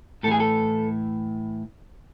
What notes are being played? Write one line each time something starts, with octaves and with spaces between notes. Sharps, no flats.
A2 E3 G#4 A4
A4